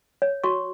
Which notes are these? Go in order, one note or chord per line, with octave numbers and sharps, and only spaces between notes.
C#5
F#4 C#6